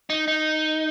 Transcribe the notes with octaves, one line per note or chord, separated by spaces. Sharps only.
D#4
D#4